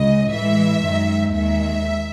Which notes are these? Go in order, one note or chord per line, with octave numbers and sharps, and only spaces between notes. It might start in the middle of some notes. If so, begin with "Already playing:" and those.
Already playing: C#2 C#3 G#3 D#5
A2 E3 G#3 E5
F#2 D#3 G#3
D#2 D#3 G#3 E5